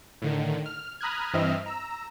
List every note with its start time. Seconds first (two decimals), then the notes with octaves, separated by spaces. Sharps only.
0.22 A2 D3 D#3
0.66 F6
1.01 A#5 B5 D#6 F6 F#6 G#6
1.33 G2 E3 C4 D#5 E5 F6
1.66 A#5 E6